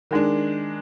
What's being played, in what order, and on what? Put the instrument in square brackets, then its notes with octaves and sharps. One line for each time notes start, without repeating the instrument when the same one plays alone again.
[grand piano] D#3 G#3 D4